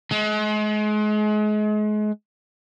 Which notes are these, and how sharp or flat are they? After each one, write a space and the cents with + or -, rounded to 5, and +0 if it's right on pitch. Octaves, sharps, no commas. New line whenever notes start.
G#3 +35